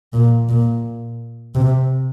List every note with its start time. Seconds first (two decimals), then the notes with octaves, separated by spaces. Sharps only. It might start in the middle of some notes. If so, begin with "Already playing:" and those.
0.13 A#2
0.49 A#2
1.55 C3